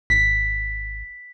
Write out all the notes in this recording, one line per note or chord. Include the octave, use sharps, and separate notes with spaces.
G#1 B6